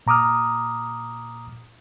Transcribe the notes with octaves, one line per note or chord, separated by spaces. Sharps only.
A#2 A#5 D6 D#6 F6